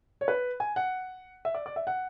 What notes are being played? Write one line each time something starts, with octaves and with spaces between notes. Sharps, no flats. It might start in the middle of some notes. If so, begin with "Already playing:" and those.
C#5
B4
G#5
F#5
E5
D5
D5
E5
F#5